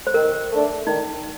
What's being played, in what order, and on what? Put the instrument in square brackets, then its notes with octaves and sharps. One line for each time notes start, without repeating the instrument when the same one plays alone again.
[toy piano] C5
[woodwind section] D#3 [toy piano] A#4
[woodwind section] A3 D4
[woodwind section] D#3 [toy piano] D#4